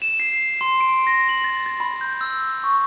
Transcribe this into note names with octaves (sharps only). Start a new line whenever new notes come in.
E7
C7
C6
D7
A#6
F#7
A6
A6
B5
G6
E6
C#6